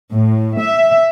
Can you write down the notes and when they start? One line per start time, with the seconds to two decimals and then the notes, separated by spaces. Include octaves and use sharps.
0.13 A2
0.58 E5